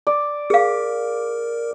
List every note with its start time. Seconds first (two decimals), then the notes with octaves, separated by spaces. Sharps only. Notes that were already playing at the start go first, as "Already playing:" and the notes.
0.07 D5
0.50 G#4 A#4 F5